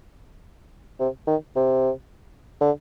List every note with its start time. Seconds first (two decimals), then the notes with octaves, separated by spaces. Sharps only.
0.99 C3
1.27 D#3
1.56 C3
2.61 D3